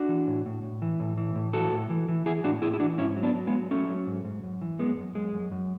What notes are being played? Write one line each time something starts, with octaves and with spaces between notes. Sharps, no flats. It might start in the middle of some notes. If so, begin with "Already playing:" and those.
Already playing: D4 F#4
E3
A2
A2
A2
E3
A2
E3
A2
E3 F#4 A4
A2
E3
E3
E3 E4 G#4
A2 D4 F#4
A2 E4 G#4
E4
E3 D4 F#4
G#2 C#4 E4
F#3
B3 D4
F#3
G#3 B3
F#3
F#3 A3 C#4
F#3
G#2
G#2
F#2
E3
F#2 G#3 B3
F#2
F#2 G#3
F#2
F#2